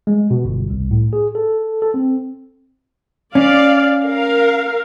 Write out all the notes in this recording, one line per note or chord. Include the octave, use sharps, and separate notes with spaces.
G#3
B2
G1
C2
A2
G#4
A4
A4
C4
C#4 D5 F5
A#4 F5